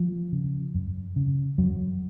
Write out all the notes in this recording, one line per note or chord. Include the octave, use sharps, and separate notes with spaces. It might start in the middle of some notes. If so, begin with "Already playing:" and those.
Already playing: F3
C#3
F#2
C#3
F#2 F#3